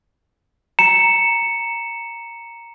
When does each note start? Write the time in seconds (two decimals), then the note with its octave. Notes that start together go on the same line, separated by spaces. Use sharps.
0.79 A#5 C#7 E7